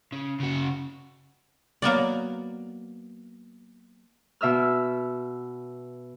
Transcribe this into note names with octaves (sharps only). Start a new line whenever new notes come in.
C#3
C#3 F#4
F#3 A#3 B3 D5
B2 E5 E6 F6